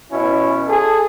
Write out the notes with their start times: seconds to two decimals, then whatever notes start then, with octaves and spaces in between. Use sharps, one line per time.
0.10 B2 C#4 E4
0.67 G#4 A4